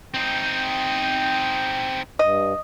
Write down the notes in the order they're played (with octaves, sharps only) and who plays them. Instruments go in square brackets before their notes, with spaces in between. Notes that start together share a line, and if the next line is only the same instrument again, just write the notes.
[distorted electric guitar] C4 D#4 [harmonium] G5
[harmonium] G2 [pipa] D#5